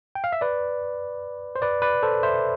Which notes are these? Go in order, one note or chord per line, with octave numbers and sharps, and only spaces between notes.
G5
F5
E5
B4 D5
C5
B4 D5
B4 D5
A4 C5
C5 E5